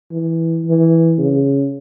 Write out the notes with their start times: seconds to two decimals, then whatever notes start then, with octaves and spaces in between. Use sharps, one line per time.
0.12 E3
0.65 E3
1.19 C#3